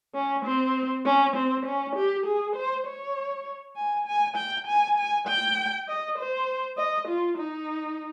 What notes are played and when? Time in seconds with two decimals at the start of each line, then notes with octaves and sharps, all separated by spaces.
0.15 C#4
0.45 C4
1.05 C#4
1.36 C4
1.65 C#4
1.96 G4
2.26 G#4
2.56 C5
2.86 C#5
3.76 G#5
4.06 G#5
4.36 G5
4.67 G#5
4.97 G#5
5.27 G5
5.88 D#5
6.18 C5
6.77 D#5
7.08 F4
7.38 D#4